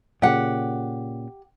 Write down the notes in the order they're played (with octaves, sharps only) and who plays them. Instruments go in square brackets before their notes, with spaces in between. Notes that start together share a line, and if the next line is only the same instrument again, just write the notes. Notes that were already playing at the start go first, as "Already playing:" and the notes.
[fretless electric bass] A#2 C#3 [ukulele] G4 F#5